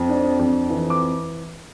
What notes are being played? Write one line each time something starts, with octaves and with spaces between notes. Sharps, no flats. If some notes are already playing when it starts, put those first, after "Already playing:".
Already playing: F2
D4
F2
E3
D6